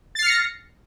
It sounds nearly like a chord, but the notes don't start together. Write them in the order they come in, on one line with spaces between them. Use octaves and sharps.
A6 C7 F6 C#7 A#6